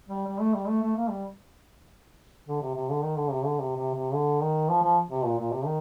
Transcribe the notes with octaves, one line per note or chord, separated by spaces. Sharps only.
G3
G3
A3
G3
A3
A3
A#3
G3
D3
C3
C3
D3
D#3
D3
C3
D3
C3
C3
C3
D3
D#3
F3
F3
C3
A#2
A#2
C3
D#3